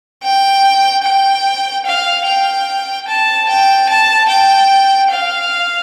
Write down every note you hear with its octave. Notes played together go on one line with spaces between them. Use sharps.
G5
G5
F5
G5
A5
G5
A5
G5
F5